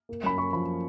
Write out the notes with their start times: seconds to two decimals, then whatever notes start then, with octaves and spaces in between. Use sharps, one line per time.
0.09 A#3
0.24 F#2 B5
0.38 A#3 C#6
0.53 F3 B5